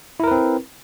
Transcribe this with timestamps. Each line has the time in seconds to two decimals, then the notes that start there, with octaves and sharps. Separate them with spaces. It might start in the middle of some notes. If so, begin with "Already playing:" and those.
0.20 E4
0.24 A#4
0.27 B4
0.31 C4